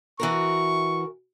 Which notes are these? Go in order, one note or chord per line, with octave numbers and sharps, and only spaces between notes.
E3 F#4 A#4 C#6